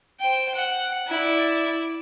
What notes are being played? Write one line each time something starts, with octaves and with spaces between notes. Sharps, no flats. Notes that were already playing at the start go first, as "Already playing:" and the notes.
C5 G5
F#5
E4 D5